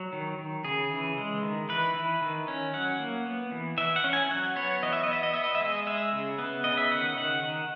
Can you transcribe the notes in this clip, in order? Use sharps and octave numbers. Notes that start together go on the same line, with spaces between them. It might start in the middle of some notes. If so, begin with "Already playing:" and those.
Already playing: F#3
D#3
D#3
C#3 G#4
E3
G#3
D#3
E3 B4
E3
D#3
C#4
F#3 F#5
A#3
B3
E3
E3 E5
F#5
C#4
G#5
F#3 F#5
B3 C#5
E3 D#5
E5
D#5
B3 E5
D#5
B3 E5
D#5
E5
G#3 D#5
G#3 E5
C#3
B3
C#3 D#5
E5
D#3 F#5
D#3 F#5
D#3